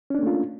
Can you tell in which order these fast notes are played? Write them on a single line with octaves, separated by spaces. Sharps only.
C#4 D4 A#3 A3 F4